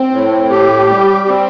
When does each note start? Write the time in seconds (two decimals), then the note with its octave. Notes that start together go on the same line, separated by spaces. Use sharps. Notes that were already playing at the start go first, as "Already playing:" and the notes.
Already playing: C4
0.11 A2
0.50 G4
0.90 G3
1.28 C4